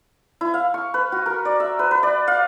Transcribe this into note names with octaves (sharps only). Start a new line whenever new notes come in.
E4
F5
C#6
B4
F#4
A#4
D5
E5
B4
B4
D5
F5